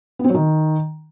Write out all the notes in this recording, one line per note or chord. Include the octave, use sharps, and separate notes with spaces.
B3
C4
F#3
D#3